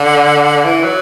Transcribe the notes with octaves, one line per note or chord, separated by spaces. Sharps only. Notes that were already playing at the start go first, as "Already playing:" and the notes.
Already playing: D3
E3
F#3